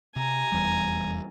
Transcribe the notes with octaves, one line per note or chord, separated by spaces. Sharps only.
C3 G#5 A#5
F1 E2 G3